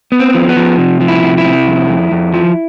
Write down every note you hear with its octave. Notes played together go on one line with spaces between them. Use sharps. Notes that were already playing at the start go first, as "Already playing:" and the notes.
B3
C4
F3
B3
F3
C3
F3
E4
C3
E4
C3
F2
F2
F2
F3